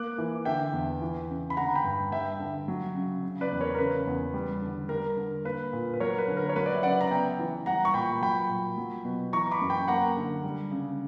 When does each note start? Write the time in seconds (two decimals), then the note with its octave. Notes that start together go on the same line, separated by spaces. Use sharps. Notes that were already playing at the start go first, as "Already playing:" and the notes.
Already playing: A#3 D6 F#6
0.18 E3
0.45 D3 E5 G5
0.73 E2
1.02 E3
1.29 C#3
1.50 B5
1.57 D3 F#5 A#5
1.75 G5 B5
1.84 G2
2.12 G3 E5 G5
2.40 D3
2.68 F#3
2.95 C#3
3.23 C#3
3.41 B4 D5
3.52 E2
3.61 A#4 C#5
3.75 A#4
3.78 C#3 B4
4.07 E2
4.34 G3
4.62 D3
4.89 G3 A#4
5.17 D3
5.45 A#3 B4
5.73 A#2
5.94 B4
6.00 F#3 A#4 C#5
6.18 B4
6.28 D3
6.37 A#4
6.49 C#5
6.56 F#3 B4
6.66 D5
6.75 E5
6.83 C#3 D5 F#5
7.01 A#5
7.11 B3 E5 G5
7.39 E3
7.66 G3 F#5 A#5
7.85 C#6
7.94 A#2 G5 B5
8.22 F#3 G5 B5
8.49 A#2
8.78 F#3
9.05 B2
9.33 E3 A#5 C#6
9.51 B5 D6
9.61 F#2
9.70 G5 B5
9.88 A#3 F#5 A#5
10.17 D3
10.44 G3
10.71 C#3